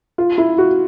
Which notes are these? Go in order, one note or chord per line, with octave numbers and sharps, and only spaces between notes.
F4
E4
F#4